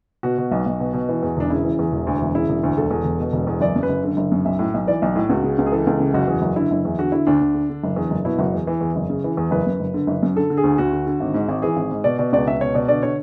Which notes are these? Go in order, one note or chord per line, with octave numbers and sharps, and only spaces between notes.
B2 F#4
B2
B1
B1
B2
B2
E3
E2
E1 D4
C#3 E4
E3
E2
E1
D2
E1
C#3 E4
E1
D2
E1 A4
E2
E1
B2
E1
E2
F#1 D5
F#2
B4
F#1
D3
F#1
F#2
B1 E5
A2
B1
E3 D5
B1
A2
C#2 F#4
C#3
C#2
G#4
E3 A4
C#2
C#3
F#1 F#4
E2
F#1
D3 E4
F#1
E2
D3 F#4
D3 E4
D2 D4
D2
D3
D3
F#1
E2
F#1
B2 E4
F#1 F#4
E2
E3
E2
F#1
C#3
E3
E2
F#1 B4
F#2
F#1
D3
F#1
F#2
D3 A4
D3
G#4
D2
D2 F#4
D3
D3
G#1
G#2
G#1
E3 G#4
G#1
G#2
B2 D5
B2 D5
C#2 D5
C#2 E5
B2 C#5
B2 D5
D3 D5
D3 C#5